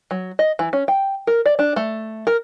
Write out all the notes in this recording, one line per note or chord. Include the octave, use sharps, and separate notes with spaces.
F#3
D#5
E3
C#4
G5
A#4
D5
D4
A3
A#4